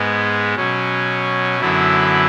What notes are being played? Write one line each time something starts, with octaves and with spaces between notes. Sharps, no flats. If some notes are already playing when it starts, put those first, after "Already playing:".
Already playing: G#2 G#3 B3
B2 F#3 C#4
F#2 D3 F#3 B3 E4